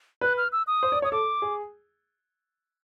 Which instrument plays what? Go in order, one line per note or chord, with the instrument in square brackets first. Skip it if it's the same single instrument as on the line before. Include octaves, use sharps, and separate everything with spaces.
[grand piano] B4 [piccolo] F#6
[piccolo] F6
E6
D#6
[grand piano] C5
D5
[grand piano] C#5 [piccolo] D#6
[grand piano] A4 [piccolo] D6
[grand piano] G#4